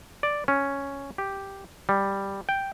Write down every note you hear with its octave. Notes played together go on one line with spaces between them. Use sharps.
D5
C#4
G4
G3
G5